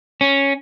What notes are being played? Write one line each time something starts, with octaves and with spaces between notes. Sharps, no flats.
C#4